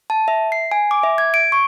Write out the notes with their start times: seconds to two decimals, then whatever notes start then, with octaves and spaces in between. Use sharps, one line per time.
0.10 A5
0.28 E5
0.52 C7
0.72 G#5
0.91 D6
1.03 E5
1.18 G#6
1.34 D7
1.52 C#6